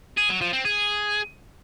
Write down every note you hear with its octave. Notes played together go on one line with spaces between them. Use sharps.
G#4
F#3
F3
C4
G#4